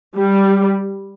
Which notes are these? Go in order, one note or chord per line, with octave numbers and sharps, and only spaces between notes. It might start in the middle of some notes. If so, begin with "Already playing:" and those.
G3